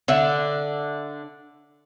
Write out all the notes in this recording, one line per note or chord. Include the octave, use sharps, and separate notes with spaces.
D3 D4 E5